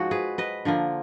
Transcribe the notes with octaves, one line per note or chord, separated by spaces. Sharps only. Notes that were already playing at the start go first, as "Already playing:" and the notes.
Already playing: G#2 F3 G#3 D#4 F#4
G#4 B4
B4 D#5
D3 F3 A#3